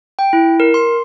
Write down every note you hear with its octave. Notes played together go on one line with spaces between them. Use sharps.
G5
E4
A#4
C6